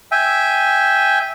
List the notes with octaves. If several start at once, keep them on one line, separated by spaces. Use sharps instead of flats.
E5 G5 G#5